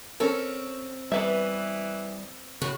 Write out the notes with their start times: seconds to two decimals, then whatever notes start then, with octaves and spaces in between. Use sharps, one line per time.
0.20 C4 C#4 A4 A#4
1.12 E3 G3 B3 B4 E5
2.62 A2 C#3 F#4